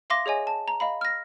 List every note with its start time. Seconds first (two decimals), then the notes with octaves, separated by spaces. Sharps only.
0.10 E5 F5 C6 D6 A#6
0.26 G#4 C#5 D#5 G#5
0.47 A5
0.68 A#5
0.80 D#5 F5 B5
1.01 F6 A#6